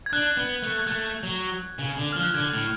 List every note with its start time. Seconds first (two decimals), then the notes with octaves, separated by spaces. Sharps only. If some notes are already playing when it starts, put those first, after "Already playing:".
0.06 G#6
0.13 D4 F#6
0.37 B3
0.63 A3
0.79 G#6
0.87 A3 F#6
1.23 F#3
1.79 C#3
1.97 D3
2.12 F3 F6
2.23 F#6
2.34 D3 G#6
2.53 A2